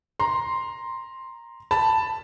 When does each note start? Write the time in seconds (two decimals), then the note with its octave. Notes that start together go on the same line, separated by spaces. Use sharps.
0.20 A#5 C6
1.71 A5 B5